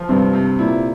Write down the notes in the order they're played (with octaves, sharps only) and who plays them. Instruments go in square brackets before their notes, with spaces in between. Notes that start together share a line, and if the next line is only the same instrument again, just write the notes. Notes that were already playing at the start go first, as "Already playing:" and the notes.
Already playing: [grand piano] F3
[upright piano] G2 [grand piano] C3
[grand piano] C3
[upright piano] A#2 [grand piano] E4